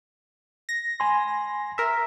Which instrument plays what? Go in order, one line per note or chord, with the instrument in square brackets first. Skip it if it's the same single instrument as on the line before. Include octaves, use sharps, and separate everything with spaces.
[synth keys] A#6
[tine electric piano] G#5 B5 C6
[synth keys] A#4 E5